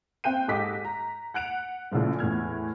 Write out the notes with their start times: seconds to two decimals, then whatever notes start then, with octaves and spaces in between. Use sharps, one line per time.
0.24 C4 F5 G5 F#6 G6 D#7
0.48 G#2 G4 A4 D#5 D6 B6
0.85 A#5
1.34 F#5 F#6 D7 F7
1.91 A#1 C#3 E3 F3 A3
2.19 E2 A2 F6 G#6